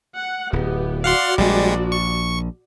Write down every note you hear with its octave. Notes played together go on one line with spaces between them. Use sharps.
F#5
D1 B3 G4
F#4 D5 F5 F#5 C6
A#1 G3 G#3
C#6